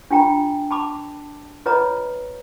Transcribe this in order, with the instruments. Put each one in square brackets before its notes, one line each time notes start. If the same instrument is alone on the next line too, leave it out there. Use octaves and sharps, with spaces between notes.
[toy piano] D4 F4 G5 A#5
A5 B5 D6
F4 B4 C#5 D#5 A#5